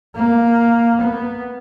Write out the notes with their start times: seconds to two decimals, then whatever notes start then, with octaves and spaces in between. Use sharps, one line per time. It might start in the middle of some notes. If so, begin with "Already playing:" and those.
0.16 A#3
1.01 B3